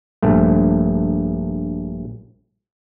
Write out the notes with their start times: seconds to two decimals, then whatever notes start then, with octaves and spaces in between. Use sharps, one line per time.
0.23 A#1 G2 A3